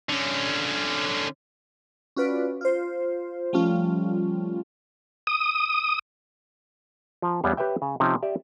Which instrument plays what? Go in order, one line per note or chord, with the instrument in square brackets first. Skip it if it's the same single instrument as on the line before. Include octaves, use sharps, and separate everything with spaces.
[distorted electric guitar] D3 C#4
[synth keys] C#4 F4 F#4 B4 D5
F4 C5
F3 G3 A3 C#4 F4
[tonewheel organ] D#6
[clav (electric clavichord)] F3 A#5
E2 G3 B3 C#5 F5
G4 B4 C#5 E5 G5
C#3
C3 F3 C#4 D#4
G4 D5 E5 G5